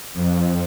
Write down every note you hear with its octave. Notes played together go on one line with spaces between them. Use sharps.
F2